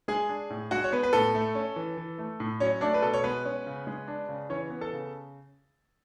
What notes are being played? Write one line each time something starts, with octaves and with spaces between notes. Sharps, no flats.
G#3 G#4 G#5
D4
A2
G#3 F#4 F#5
C#5
B3 B4
B4
A2 A4
A3
C#4
E3
E3
A3
A2
F#3 C#4 C#5
A3 D4 D5
B4
B2 A4
C#5
G#3 B3 B4
C#4
C#3
G#3
D4
C#3
E3 C#4 C#5
B3
A4 A5
C#3